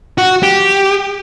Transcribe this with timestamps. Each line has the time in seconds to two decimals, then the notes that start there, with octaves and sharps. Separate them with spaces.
0.18 F#4
0.43 G4